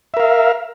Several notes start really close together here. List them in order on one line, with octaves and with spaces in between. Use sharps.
E5 A#4 F5